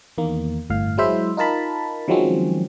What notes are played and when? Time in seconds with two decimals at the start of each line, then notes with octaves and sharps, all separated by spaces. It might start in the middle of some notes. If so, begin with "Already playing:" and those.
0.18 E2 D#3 A#3
0.70 G1 A2 F5
0.98 F#3 G#3 E4 C5 E5
1.37 D#4 F4 A#4 A5 B5
2.08 D#3 F3 F#3 G#3 C4 C#4